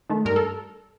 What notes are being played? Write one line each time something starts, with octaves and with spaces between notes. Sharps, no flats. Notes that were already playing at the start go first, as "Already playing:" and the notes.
D#3 A3
G2 A#4
A4